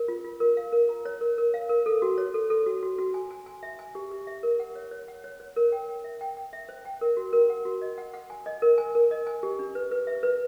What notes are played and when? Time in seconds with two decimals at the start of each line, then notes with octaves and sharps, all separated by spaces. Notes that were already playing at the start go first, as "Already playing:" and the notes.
Already playing: A#4
0.08 F4
0.24 F4
0.40 A#4
0.57 F5
0.72 A#4
0.89 A#5
1.05 C#5
1.21 A#4
1.38 A#4
1.54 F5
1.69 A#4
1.86 A4
2.02 F#4
2.18 C#5
2.34 A4
2.50 A4
2.66 F#4
2.83 F#4
2.99 F#4
3.14 G#5
3.31 G#5
3.46 G#5
3.63 E5
3.79 G#5
3.95 G4
4.11 G4
4.27 E5
4.43 A#4
4.60 F#5
4.76 C#5
4.91 C#5
5.08 F#5
5.24 C#5
5.40 C#5
5.56 A#4
5.72 G5
5.89 G5
6.04 E5
6.21 G5
6.37 G5
6.53 E5
6.69 C5
6.85 G5
7.01 A#4
7.17 F#4
7.33 A#4
7.50 F#5
7.65 F#4
7.82 D#5
7.98 F#5
8.13 F#5
8.30 G#5
8.46 D#5
8.62 A#4
8.78 G#5
8.95 A#4
9.11 D#5
9.27 G#5
9.43 G4
9.59 D4
9.75 B4
9.91 B4
10.07 E5
10.23 B4